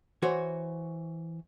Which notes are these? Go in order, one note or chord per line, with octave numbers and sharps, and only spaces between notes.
E3 F#4 C5 C#5